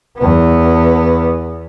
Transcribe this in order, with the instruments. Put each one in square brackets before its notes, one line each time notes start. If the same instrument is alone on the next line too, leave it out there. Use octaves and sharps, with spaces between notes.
[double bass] E2 B3